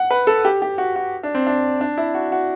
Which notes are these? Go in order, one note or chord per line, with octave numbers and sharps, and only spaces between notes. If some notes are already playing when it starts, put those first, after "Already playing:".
Already playing: F#5
B4
A4
G4
G4
F#4
F#4
D4
C4
D4
D4
E4
F#4
F#4